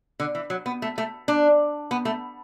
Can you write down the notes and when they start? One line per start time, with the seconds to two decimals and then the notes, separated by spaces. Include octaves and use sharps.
0.20 D3
0.35 E3
0.50 F#3
0.66 B3
0.82 A3
0.98 A3
1.28 D4
1.91 B3
2.05 A3